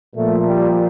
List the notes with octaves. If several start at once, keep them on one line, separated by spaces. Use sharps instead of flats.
A#2 F3 A3
G3